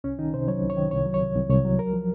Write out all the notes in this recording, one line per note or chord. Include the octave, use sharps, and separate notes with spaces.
C2 C#4
D#3 D#4
C3 C5
F#3 C#5
C2
C#5
D#3
C2 C#5
F#3
C#5
C3
C2
C2 C#5
F#3
C#2 A#4
F3